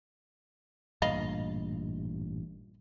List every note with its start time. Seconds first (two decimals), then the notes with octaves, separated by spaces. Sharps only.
1.02 A1 G2 A#2 D#5 F5 B5